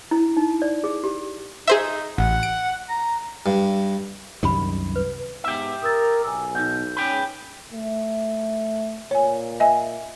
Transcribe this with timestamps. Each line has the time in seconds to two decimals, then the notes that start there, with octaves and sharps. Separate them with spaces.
0.11 E4
0.37 D#4
0.62 D5
0.84 G#4
1.04 G4
1.67 D#4 G#4 C5 E5
2.18 A1 F#5
2.43 D7
2.89 A#5
3.46 G2
4.43 C2 F#2 D#3 G4 B5
4.96 B4
5.44 G#2 B3 G4 E5
5.82 A#4 D#6 E6 A6
6.24 B1 G#5 E6
6.55 B2 D#4 G6
6.97 C#4 G#4 B4 G5
7.73 A3
9.11 A#2 C#5 G#5
9.60 D#5 E5 G#5